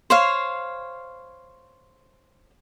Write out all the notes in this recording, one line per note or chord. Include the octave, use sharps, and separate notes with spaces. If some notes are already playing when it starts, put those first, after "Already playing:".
C5 C#5 F5